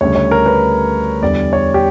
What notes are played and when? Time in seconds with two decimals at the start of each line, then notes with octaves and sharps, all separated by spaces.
0.01 D2 C#3 G3 C#5
0.16 C#5
0.31 A#4
0.46 B4
1.22 E2 D3 G3 D5
1.53 C#5
1.74 G4